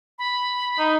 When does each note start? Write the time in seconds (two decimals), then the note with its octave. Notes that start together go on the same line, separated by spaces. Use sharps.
0.19 B5
0.79 D#4